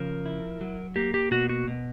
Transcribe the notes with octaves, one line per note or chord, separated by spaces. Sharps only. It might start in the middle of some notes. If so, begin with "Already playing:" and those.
Already playing: C#3 F3 A#4
E4
F#3
A#3 G4
G4
B2 F#4
F#4
B2